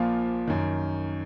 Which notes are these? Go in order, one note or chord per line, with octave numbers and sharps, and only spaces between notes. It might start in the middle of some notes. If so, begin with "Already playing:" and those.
Already playing: A#1 A#2 F3 A#3 F4
F#2 D#3